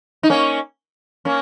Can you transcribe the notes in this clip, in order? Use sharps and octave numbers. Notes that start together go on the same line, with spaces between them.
D#4
A#3 C#4
A#3 C#4